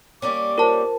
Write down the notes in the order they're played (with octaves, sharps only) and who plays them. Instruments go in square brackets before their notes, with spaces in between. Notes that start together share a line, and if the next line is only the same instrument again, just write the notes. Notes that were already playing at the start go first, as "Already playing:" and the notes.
[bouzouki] G3 A#3 C#4 [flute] D6
[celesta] F4 C5 [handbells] A#4 A5